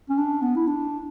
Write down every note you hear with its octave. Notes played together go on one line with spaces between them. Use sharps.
C#4
D4
B3
E4
D4